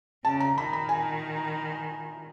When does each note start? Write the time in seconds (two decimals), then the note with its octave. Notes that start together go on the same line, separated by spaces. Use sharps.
0.24 C#3 A5
0.40 A#5
0.57 D#3 B5
0.73 B5
0.89 G#5